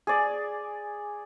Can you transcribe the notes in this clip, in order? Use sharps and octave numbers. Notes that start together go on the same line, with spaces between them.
G#4 D5